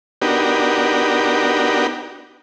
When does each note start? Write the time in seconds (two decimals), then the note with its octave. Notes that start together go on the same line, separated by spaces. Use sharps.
0.22 B3 D4 D#4 F#4 G4 A#4